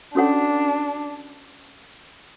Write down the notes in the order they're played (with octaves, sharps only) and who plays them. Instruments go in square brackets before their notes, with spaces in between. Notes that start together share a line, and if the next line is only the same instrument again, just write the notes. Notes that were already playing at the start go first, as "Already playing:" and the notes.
[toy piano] C#4 F#4 A4 C#5 F#5 [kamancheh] D4